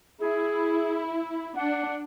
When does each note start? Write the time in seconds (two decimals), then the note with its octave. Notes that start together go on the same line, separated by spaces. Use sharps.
0.21 E4 G#4
1.57 D4 F#5